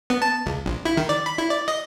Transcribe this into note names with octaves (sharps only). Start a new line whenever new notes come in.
B3
A5
C#2
A#1
E4
D#3
D5
B5
E4
D5
D#5